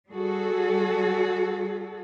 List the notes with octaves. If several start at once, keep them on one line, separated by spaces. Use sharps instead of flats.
G3 F#4 G#4 A4